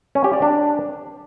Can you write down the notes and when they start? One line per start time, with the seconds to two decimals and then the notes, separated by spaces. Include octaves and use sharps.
0.15 C#4
0.24 G4
0.33 D5
0.42 D4